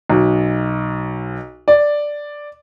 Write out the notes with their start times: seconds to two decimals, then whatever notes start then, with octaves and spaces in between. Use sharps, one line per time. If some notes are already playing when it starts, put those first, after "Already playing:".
0.10 B1
1.68 D5